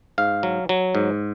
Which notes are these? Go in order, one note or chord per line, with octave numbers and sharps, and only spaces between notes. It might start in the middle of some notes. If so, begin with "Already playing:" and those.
G#2 F5
F#3
F#3
G#2